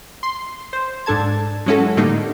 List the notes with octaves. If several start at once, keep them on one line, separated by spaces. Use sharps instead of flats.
C6
C5
G#2 D4 A4 A5 G#6
F#3 G#3 C#4 E4 F#4 A4
A2 D3 G3 A#3 D#4